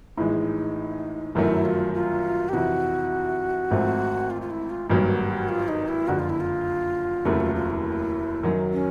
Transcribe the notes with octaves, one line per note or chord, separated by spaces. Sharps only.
A#1 A2 E3 G#3 D#4
G1 F#2 D#3 F#3 A3 E4
F4
F4
G4
F2 C3 E3 F#4
G#1 G#2 F3 A3 C4
F4
F4
E4
F4
G#1 G2 D#3 F#3 A#3 F#4
F4
D#4
E4
F#1 F2 D3 F#4
F4
E4
F4
F1 D#2 C#3 F#3 A3 E4
F4
F4
E4
F#2 D#3 F#3
C#4